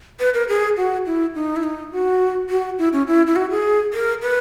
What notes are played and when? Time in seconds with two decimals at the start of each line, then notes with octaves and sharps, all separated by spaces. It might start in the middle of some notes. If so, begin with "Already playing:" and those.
0.20 B4
0.34 A#4
0.49 G#4
0.77 F#4
1.06 E4
1.35 D#4
1.56 E4
1.63 D#4
1.92 F#4
2.50 F#4
2.79 E4
2.93 C#4
3.07 E4
3.27 E4
3.36 F#4
3.50 G#4
3.94 A#4
4.22 B4